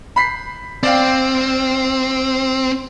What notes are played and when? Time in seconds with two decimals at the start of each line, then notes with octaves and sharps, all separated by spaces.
0.16 B5 B6 C7
0.83 C4 D5 F5 G5